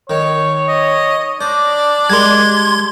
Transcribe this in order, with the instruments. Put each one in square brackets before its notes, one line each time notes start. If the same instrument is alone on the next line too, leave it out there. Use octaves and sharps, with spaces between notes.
[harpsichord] D#3 [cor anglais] C#5
[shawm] D#5
[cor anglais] D4 [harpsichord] C5 [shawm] D5
[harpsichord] G3 G#3 A#4 [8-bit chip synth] C6 G#6